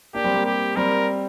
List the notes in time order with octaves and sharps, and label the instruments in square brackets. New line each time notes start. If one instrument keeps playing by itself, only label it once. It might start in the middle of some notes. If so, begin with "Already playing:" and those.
[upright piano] A#3 D4 [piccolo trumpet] G4
[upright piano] G3 C4
A#3
[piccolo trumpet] G4
[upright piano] G3 C4 [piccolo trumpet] A#4